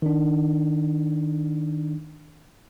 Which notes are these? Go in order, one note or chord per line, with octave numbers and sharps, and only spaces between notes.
D#3 D4